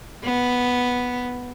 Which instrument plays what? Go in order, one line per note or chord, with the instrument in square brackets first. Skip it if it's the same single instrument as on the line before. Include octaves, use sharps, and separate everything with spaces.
[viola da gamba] B3